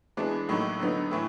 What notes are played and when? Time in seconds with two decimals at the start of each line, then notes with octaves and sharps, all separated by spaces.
0.17 E3 G#3 B3 D4
0.49 A2 F#3 A#3 D#4
0.80 D3 F#3 B3 D#4
1.11 A2 E3